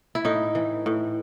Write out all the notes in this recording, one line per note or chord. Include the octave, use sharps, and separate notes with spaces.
E4
A2 D#4
E3
A2